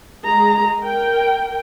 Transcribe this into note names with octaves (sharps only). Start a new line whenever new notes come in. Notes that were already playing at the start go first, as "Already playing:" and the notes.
G#3 G#4 A#5
A#4 G5